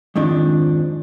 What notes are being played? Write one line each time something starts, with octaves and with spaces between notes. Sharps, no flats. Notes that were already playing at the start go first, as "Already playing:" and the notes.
F2 G#2 D#3 F3 D4